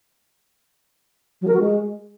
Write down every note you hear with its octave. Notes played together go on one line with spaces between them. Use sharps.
F#3
A#4
F#4
G#3